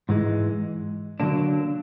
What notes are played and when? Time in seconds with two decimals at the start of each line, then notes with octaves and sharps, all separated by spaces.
0.09 G#2 E3 G#3
1.20 D3 F#3 A#3 D4